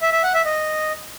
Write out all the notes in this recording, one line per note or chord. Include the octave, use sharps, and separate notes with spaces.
E5
E5
F#5
E5
D#5